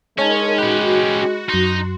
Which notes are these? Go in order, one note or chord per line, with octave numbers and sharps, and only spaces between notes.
G#3 C#4 D#4 A#4 C#5 A5 G#6
C#4 F#4 G4 B5 F#6
F#2 D#4 C6